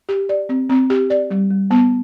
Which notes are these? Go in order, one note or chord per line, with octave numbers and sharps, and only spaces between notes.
G4
D5
C4
C4
G4
D5
G3
G3
B3